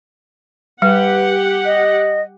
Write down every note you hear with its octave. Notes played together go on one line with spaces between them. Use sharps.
G3 G4 B4 F#5
D#5